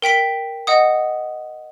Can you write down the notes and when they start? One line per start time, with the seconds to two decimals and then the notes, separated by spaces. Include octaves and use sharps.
0.02 A#4 G5 B6 D7
0.67 D#5 F#5 D#6